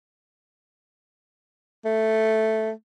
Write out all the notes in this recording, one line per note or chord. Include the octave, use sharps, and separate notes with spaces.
A3